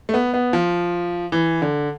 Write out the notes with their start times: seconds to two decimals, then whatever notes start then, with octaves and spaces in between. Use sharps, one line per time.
0.09 A3
0.14 B3
0.34 B3
0.53 F3
1.32 E3
1.62 D3